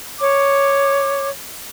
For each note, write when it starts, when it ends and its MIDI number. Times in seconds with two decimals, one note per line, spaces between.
0.20 1.28 73
0.20 1.28 86